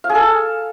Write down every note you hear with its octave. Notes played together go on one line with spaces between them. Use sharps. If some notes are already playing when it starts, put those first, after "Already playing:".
F5
G#4
A4